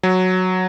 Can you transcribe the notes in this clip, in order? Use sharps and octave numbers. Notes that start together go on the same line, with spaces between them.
F#3